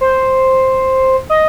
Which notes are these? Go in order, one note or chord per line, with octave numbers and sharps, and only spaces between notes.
C5
D#5